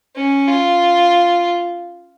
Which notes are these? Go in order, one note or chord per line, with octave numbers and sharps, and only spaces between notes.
C#4
F4